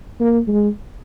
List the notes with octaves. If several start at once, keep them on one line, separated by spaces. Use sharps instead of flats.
A#3
G#3